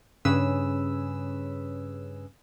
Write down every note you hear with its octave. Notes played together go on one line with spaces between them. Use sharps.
G2 C#3 C#4 G#4 B4 E6